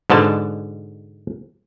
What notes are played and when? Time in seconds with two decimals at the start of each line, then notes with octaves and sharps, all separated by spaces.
0.10 G#2 B2 D3 A5